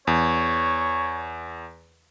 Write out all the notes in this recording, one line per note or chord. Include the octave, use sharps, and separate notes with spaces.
E2 C#5